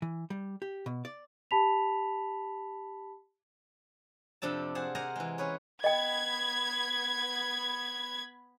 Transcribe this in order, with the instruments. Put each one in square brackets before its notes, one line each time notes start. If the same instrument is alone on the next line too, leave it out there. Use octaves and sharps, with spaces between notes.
[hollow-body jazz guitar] E3
G3
G4
B2
D5
[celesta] G4 A5 B5 B6 F7
[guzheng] F2 C3 D4 A4 A5
G#4 C5 F#5 A5
A#4 C5 D#5 F#5 G#5 A#5
E3 G#3
C#4 G#4 B4 C#5
[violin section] B3 B5 G#6 [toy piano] D#5 G5